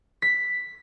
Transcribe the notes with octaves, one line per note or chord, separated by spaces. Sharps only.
B6